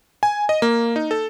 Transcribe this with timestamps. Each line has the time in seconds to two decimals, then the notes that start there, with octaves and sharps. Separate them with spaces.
0.23 G#5
0.49 D#5
0.62 A#3
0.96 D#4
1.11 A4